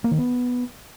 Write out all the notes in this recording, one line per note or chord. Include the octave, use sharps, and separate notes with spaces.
A#3
D#3
B3